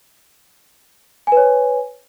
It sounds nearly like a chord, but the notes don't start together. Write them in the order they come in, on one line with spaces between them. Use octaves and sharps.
G#5 B4 C#5